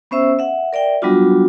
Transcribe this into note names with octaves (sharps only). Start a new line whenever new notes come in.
B3 C#4 C5 E5 E6
E5 F#5
A#4 D5 E5 G5
F#3 G3 B3 D4 F4 F#4